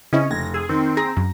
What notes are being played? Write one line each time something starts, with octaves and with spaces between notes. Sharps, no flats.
C#3 C4 C#4 E4 D#5
F1 G#6 A#6
G#4 E6
D#3 C4
G#4 A#5 A#6
F#2